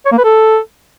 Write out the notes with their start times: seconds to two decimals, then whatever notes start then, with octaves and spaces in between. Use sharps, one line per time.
0.06 C#5
0.12 A#3
0.18 B4
0.24 A4